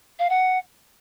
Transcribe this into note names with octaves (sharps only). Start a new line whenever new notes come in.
F5
F#5